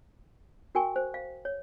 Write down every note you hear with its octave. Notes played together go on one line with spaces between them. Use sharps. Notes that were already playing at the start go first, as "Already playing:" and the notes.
F#4 A#4 G5 G#5 C#6
C5
F5
C#5